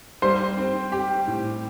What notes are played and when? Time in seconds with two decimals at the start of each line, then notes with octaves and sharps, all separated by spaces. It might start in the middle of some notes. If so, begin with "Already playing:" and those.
0.22 G3 C5
0.57 C4
0.92 G4
1.27 A2